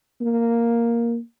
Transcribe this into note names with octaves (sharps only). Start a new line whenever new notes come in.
A#3